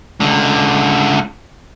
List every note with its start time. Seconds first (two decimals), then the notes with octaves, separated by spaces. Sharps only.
0.20 C#2 D3